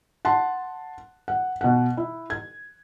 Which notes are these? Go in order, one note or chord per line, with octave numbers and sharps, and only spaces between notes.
F#5 A5 C6
F#5
B2 F#5
E4
G#6